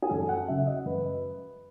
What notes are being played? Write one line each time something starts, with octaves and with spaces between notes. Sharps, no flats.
G#4
F#2 A4
F#5
C#3 F#3 C#4 E5
D#5
F#2 B4